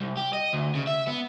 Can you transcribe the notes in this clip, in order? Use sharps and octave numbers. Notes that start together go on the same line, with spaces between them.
C2
G4
D#5
D2
C#3
E5
B3